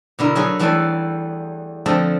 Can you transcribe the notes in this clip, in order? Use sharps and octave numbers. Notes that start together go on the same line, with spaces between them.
B2 D3 E4 A#4
F#3 A3 G#4 C#5 D#5 E5
E2 E3 G3 A3 G#5 A5
D3 F3 A3 C4 D#5 A5